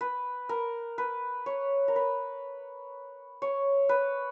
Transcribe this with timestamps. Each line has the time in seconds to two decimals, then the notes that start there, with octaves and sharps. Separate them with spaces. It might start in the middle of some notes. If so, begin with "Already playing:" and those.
0.01 B4
0.49 A#4
0.98 B4
1.46 C#5
1.88 A#4
1.96 B4
3.42 C#5
3.89 B4